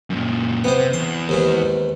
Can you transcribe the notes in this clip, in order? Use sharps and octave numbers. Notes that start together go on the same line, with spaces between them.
F#2 A#2
C3 B3 C5
E2 C6
D#2 G#2 E3